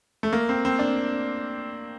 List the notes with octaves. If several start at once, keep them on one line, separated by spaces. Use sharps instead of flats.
A3
A#3
C4
C4
D4